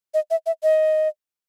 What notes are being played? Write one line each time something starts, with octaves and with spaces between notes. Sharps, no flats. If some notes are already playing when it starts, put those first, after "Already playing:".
D#5
E5
E5
D#5